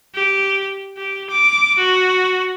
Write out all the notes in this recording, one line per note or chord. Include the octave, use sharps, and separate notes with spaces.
G4
G4
D6
F#4